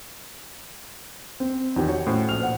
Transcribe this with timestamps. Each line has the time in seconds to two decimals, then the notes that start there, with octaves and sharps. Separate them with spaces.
1.40 C4
1.76 E2 D#3 D#4 G4
1.88 F#4 C#5
2.07 A2 C#4 C5
2.29 A#1 F6 F7
2.40 C5 F#5